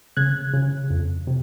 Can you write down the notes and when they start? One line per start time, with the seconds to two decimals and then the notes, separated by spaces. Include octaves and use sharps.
0.17 C#3 F#6 G#6
0.54 C#3
0.90 F2
1.27 C3